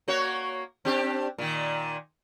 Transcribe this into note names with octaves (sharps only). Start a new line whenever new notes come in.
A#3 F#4 C#5
C4 D4 G4
A#2 D#3